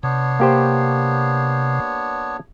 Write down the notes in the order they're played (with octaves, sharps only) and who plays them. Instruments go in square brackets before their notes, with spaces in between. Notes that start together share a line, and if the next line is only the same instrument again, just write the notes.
[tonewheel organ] C3 [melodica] B3 D4 C#5
[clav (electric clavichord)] A#3 G4 C5